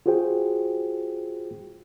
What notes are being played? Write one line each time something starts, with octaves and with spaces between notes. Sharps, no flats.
F4 F#4 G#4 C5 G5